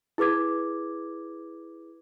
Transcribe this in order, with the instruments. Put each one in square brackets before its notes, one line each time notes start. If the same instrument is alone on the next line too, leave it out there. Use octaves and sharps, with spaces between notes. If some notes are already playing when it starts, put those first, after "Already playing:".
[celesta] E4 G#4 B4 D6 G#6